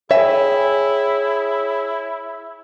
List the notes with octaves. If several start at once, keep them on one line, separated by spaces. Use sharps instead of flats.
E4 G#4 C#5 E5 G5 G#5